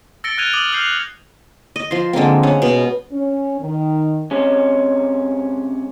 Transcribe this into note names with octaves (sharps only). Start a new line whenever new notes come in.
E6 A6 A#6 C#7 D7 G7
F6 F#6 G#6 D#7 F7 G7
D6 D#6 F6 F#7
E6 F6 G6 C7 F7
F#6
D#5
F3 C6
D3 G#3 A#3 C4
C#4 F#5
B2
C#4
D#3
C3 G#3 C#4